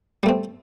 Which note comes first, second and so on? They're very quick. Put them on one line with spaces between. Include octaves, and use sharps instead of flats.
G3 A3 C4